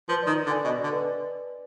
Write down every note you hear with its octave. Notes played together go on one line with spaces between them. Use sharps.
F3 B4
D#3 D5
D5
D3
G#5
B2 D#5
D5
D3
B4